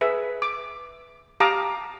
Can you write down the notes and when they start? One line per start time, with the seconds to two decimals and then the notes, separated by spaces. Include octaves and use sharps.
0.01 G#4 B4 E5
0.42 D6
1.40 G4 F5 A5 A#5 D6 D#6